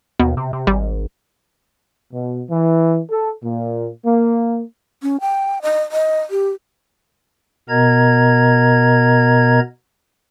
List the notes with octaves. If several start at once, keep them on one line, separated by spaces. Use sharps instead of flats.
D#2 B2
C3
C3
G#1 G3
B2
E3
A4
A#2
A#3
C#4
G5
D#5
D#5
G4
B2 B3 A#4 D#5 A#5 G#6